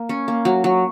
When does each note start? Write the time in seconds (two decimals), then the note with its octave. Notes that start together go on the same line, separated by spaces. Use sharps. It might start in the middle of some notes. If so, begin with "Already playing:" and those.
Already playing: A#3
0.09 C#4
0.28 A#3
0.45 F#3
0.64 F#3